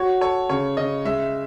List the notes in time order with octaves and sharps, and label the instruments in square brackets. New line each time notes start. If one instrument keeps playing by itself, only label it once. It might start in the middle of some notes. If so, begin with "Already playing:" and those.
Already playing: [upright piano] F#4 [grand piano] C#5
[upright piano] A4 [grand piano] C#5
[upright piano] C#3 [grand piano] C#5
[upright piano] C#3 [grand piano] D#5
[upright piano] G#3 [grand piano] E5